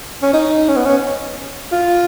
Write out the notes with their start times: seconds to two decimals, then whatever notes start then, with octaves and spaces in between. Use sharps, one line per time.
0.23 C#4
0.33 D#4
0.69 C#4
0.77 B3
0.85 C#4
1.72 F4